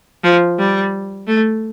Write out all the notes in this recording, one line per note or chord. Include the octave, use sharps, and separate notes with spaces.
F3
G3
A3